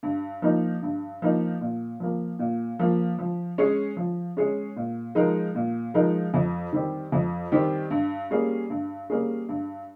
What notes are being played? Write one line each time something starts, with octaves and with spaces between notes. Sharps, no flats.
G2
F3 A#3 D#4
G2
F3 A#3 D#4
A#2
F3 A#3
A#2
F3 A#3
F3
G#3 C#4 G#4 C#5
F3
G#3 C#4 G#4 C#5
A#2
F3 G#3 D#4 A#4
A#2
F3 G#3 D#4 A#4
F2
D#3 G3 C4 G4
F2
D#3 G3 C4 G4
G2
G3 A#3 C#4 G#4
G2
G3 A#3 C#4 G#4
G2